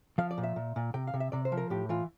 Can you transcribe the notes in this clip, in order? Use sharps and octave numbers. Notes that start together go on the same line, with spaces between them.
F3 F5
D5
A#2
E5
A#2
A#2
C3 G5
F5
C3
E5
C3 D5
C5
F3
A#4
A2 G4
E3 F4